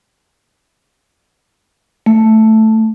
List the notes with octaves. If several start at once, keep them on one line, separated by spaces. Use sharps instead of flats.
A3